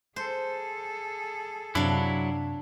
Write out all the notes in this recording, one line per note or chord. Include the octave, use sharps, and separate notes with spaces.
G#4 A4 C5
F#2 C3 F#3 D4 E4 F5